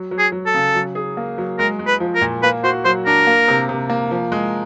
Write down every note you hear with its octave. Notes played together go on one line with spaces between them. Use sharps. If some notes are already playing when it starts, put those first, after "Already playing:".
Already playing: F#3
F#3
G#4
F#3
A4
C#3
F#3
G#4
A#3
F#3
G#3 A#4
G#3
B4
F3
A#4
A#2
A#3 B4
F#4 C5
F#3 C5
D4 A#4
A#3
C3
C3
A#3
F3
G#3